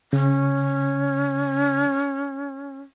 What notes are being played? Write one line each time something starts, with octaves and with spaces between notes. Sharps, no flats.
C#3 C#4